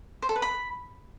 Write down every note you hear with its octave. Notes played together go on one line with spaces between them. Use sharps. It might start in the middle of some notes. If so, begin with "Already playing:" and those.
C5
A4
B4
B5